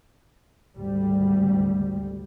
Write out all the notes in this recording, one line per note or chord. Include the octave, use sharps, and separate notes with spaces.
G#1 D2 G3